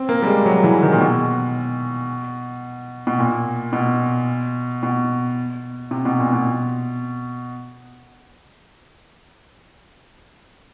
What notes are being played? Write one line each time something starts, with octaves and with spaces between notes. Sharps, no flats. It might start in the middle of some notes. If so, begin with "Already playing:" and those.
Already playing: C4
A#3
G3
G#3
F#3
E3
D#3
A#2
B2
B2
A#2
B2
B2
C3
B2
A#2
B2